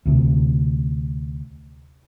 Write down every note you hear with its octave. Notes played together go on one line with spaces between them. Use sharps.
D2 C3